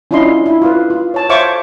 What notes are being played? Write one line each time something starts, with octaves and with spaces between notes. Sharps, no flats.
C#4 D4 E4 F4 D#5 C6
E4
F4 B4
F4
C#5 A5
C5 C#5 E5 F5 C#6 D6